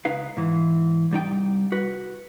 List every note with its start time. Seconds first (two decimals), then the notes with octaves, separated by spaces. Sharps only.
0.05 C#2 D#4 B4 F5
0.37 G#2 E3
1.11 C2 G3 D#4 G5
1.72 F#4 B4